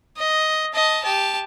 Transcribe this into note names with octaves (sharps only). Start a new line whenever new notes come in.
D#5
D#5 A5
G4 A5